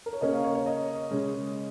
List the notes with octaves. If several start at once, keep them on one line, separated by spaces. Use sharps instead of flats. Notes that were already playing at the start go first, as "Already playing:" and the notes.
A#4
C#5
C#3 A#3 C#4 D#5
F5
C#5
C#5
D#5
C#3 G#3 C#4